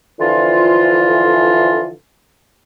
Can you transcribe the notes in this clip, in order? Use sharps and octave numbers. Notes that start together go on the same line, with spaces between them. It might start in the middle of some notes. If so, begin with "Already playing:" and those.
D3 E3 F3 F4